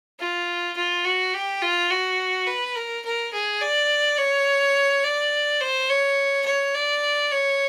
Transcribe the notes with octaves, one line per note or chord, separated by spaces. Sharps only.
F4
F4
F#4
G4
F4
F#4
B4
A#4
A#4
G#4
D5
C#5
D5
C5
C#5
C#5
D5
C#5